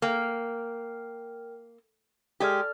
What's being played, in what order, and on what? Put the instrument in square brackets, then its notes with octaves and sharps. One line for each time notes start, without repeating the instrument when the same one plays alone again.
[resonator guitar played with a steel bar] A#3 [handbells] A#4 G5 F6
[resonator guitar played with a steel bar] G#3 G4 [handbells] A4 D5 F6